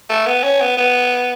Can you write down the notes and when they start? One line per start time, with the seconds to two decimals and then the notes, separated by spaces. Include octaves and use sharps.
0.09 A3
0.26 B3
0.43 C#4
0.61 B3
0.77 B3